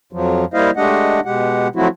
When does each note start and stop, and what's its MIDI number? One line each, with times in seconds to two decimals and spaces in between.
0.13 0.45 41
0.13 0.45 53
0.13 0.45 54
0.54 0.71 55
0.54 0.71 58
0.54 0.71 64
0.54 0.71 72
0.54 0.71 75
0.54 0.71 77
0.77 1.20 56
0.77 1.20 57
0.77 1.20 62
0.77 1.20 67
0.77 1.20 75
0.77 1.20 78
1.25 1.68 47
1.25 1.68 56
1.25 1.68 67
1.25 1.68 78
1.76 1.88 53
1.76 1.88 54
1.76 1.88 57
1.76 1.88 60
1.76 1.88 64
1.76 1.88 66